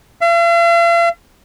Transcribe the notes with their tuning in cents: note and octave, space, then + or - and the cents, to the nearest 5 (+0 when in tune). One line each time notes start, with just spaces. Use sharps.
F5 -45